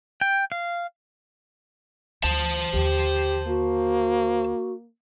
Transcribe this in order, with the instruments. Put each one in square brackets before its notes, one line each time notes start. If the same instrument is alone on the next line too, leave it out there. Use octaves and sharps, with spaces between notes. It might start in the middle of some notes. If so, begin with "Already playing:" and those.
[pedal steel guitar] G5
F5
[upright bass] D2 [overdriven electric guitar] C5 A5
[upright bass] D#2 D3 [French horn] G4
[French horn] A#3 [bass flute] F#4